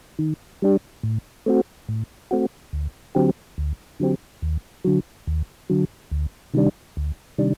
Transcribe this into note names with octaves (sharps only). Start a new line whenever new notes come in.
D#3
G3 D4 G4
A2
A3 C4 F#4
A2
A3 C4 F#4
D2
D3 F#3 C4 G4
D2
D3 F#3 C4 G4
D#2
D3 F#3
D#2
D3 F#3
D2
C3 D#3 G3 D4
D2
C3 D#3 G3 D4